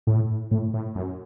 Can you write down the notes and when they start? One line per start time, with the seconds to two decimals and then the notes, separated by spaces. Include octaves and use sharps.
0.07 A2
0.51 A2
0.74 A2
0.95 F#2